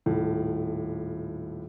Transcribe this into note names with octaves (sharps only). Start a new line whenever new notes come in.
D#1 A2